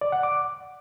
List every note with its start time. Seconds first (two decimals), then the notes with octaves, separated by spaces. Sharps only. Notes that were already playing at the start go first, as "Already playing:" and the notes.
0.01 D5
0.12 F#5
0.23 D6